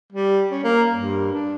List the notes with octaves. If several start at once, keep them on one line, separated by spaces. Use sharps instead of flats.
G3
C#4
A#3
G2
D4